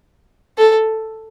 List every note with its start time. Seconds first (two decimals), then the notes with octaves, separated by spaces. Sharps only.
0.58 A4